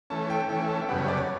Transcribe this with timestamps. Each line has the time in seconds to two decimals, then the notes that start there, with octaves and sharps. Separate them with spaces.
0.10 E3 A3 C#4 A5
0.30 G5
0.49 E3 A3 C#4 G5
0.69 A5
0.81 G5
0.88 F#2 C#3 G3 B3 F#5
1.03 C#5
1.08 D5
1.17 C#5